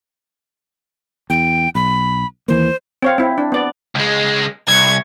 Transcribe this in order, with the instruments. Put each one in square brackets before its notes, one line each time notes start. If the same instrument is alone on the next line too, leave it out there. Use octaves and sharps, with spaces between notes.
[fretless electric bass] E2 [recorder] G5
[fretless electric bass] B1 [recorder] B5
[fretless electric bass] D#2 E3 A#3 [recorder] C5
[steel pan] C4 C#5 F5
C4 E4
D4
B3 D5
[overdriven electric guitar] C#2 G#3
[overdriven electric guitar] C2 [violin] C#6 G#6